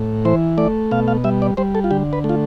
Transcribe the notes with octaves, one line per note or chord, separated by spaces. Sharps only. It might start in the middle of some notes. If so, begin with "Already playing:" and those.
Already playing: A2
E3 C5
A3 D5
B2 F5
F5
G3 E5
D5
G3 C5
A4
F4
D3 G4
B4
A3
F4